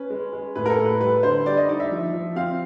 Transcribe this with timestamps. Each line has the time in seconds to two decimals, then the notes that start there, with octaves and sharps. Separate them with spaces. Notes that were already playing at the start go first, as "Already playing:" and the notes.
Already playing: C#4 B4
0.10 G#3
0.33 G#3
0.55 A2 B4
0.66 A#4
0.70 A4
0.78 A2
0.85 B4
1.00 G3 B4
1.23 D3 C5
1.46 G3 D5
1.57 D#5
1.69 D#4 D5
1.80 E5
1.92 F3
2.13 F3
2.36 C4 F5